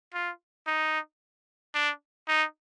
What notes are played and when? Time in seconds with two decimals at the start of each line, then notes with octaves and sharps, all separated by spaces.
0.14 F4
0.67 D#4
1.75 D4
2.28 D#4